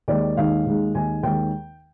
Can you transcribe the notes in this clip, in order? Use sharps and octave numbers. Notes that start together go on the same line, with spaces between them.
D#2 D#3 G#3 D5
D#2 D#3 G#3 F5
D#2 D#3 G#3
D#2 D#3 G#3 G#5
D#2 D#3 G#3 G5